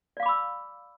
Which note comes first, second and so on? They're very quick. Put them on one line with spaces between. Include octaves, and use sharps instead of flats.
D5 F5 D6 B5 E6